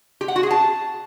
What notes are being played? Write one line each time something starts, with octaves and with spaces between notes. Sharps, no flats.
G4
F#5
F#4
G#4
A5